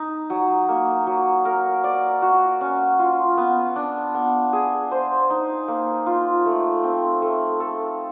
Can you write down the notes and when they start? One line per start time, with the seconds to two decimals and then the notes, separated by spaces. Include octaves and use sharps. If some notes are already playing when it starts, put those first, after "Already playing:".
Already playing: D#4
0.30 F#3
0.69 A#3
1.07 F#3
1.45 A#4
1.84 D5
2.22 F#4
2.61 C#4
2.99 F4
3.38 B3
3.76 D4
4.15 B3
4.53 G#4
4.91 C5
5.30 D#4
5.68 A#3
6.06 F4
6.45 A3
6.83 C4
7.22 A3
7.60 A4